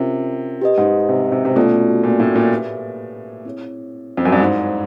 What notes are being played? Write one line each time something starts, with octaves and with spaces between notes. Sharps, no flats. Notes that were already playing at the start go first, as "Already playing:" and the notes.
Already playing: C3 C#4 F4 A#4
G4 B4 D#5
G#2
C3
C3
C3
B2 A3 C#4 F4 A4 D5
A#2
A2
A#2
G4 B4 E5 G#5
C4 E4 G#4 C#5
F2
F#2
G2
G#2 E4 G#4 C5 D#5